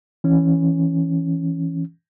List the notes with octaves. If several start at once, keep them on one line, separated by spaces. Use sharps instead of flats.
E3 C#4